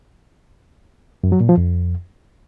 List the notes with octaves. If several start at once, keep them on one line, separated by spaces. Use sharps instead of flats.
F#2
F#3
A#2
F3
F2